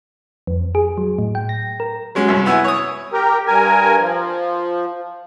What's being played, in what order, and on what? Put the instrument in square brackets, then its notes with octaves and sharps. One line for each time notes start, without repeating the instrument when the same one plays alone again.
[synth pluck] F2
G#4
F#3
A2
G5
A#6
A#4
[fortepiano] F#3 G#3 C#4
C2 G2
B3 E4 G#5
C#5 D#6
[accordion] G4 A#4
G2 A#4 G#5
F3